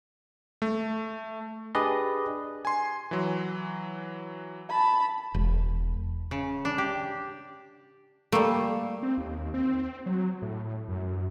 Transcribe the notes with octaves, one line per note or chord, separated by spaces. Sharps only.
A3
D4 G4 G#4 B4 D5 D#5
G#5 C6
E3 F#3
A5 B5
E1
C#3
D4
G4
G3 A3 A#3
C4
D#2
C4
F#3
A2
F#2